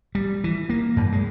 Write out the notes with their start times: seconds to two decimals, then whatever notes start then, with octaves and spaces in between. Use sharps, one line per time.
0.15 G3
0.44 E3
0.69 A#3
0.96 F#2
1.12 G#3